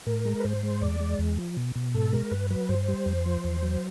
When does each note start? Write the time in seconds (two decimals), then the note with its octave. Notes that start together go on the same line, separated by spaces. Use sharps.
0.06 A2 A#4
0.25 G#3
0.40 B4
0.44 G#2 C5
0.63 G#3
0.82 E2 D5
1.00 G#3
1.19 E2
1.38 F3
1.57 B2
1.76 B2
1.94 G#2 A4
2.12 G#3 A#4
2.31 G2 B4
2.50 F#3 B4
2.69 G2 C5
2.88 G3
3.06 F2
3.26 F3
3.44 E2
3.62 F#3